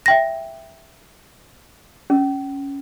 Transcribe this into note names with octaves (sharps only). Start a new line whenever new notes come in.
E5 G5 A#6
C#4